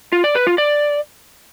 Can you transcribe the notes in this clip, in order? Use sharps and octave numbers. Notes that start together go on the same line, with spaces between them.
F4
D5
B4
F4
D5